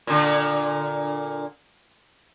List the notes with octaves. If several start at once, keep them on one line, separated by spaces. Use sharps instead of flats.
A#2 D3